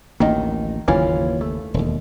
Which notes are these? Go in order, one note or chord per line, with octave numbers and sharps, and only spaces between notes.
A1 D2 D#3 A#3 D#5
F#1 D#2 E3 C#4 F4
A3
E1 D#2